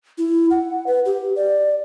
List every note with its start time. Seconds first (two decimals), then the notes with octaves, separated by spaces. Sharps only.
0.18 E4
0.51 F#5
0.87 B4
1.05 G4
1.36 D5